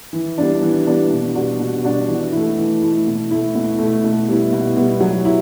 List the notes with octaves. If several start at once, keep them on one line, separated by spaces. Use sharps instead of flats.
E3
G3 B3 D4
E3
G3 B3 D4
B2
G3 D4 F#4
B2
G3 D4 F#4
E3
A3 E4
E3
A3 E4
B2
A3 E4
B2
A3 E4
B2
G3 B3 E4
B2
G3 B3 E4
F#3
E4